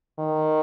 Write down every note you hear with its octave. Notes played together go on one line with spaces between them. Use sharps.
D#3